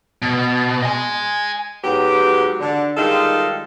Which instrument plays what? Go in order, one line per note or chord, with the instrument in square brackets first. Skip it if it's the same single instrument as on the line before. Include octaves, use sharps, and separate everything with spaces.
[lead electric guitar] B2
D#5 G#5
[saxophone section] G#2 F#3 B3 G4
D3
D#3 G3 G#3 D#4 F4 A4